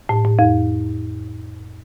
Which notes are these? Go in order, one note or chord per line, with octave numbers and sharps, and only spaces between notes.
A2
A2
F2